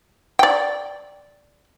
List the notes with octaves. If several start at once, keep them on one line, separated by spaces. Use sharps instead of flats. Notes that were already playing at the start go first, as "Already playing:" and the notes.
D5 G5